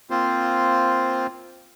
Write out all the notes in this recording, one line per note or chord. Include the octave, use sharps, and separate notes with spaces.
A#3 C4 F4 C5